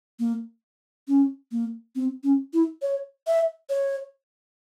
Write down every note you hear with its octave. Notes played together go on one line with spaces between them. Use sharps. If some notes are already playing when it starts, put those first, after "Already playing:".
A#3
C#4
A#3
C4
C#4
E4
C#5
E5
C#5